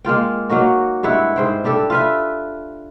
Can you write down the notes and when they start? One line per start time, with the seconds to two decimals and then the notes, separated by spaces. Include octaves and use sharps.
0.04 G#3 A#3 F4 G5
0.49 F#3 A#3 D#4 F#4
1.03 G2 G#3 E4 F#5
1.36 G#2 C5 G5
1.64 G3 D4 G4 A4
1.90 F4 B4 E5